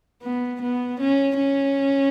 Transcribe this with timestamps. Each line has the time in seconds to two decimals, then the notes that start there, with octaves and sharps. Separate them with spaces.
0.22 B3
0.62 B3
1.00 C#4
1.38 C#4